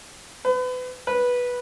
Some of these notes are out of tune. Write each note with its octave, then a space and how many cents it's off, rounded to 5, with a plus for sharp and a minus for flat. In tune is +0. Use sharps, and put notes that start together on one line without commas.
B4 +35
B4 -10